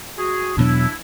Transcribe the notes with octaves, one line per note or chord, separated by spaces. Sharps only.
F#4 G#4
E2 B2 F#3 D4 E4